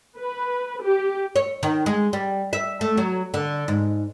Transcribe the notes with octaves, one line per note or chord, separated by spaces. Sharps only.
B4
G4
C#5
D#3
G#3
G3
E5
A3
F#3
D3
G#2